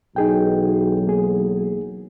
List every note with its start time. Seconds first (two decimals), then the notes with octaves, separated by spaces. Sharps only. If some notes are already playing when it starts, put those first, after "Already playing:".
0.16 B1 E3 F#3 D#4 G#4 G5
1.07 A#3 G#4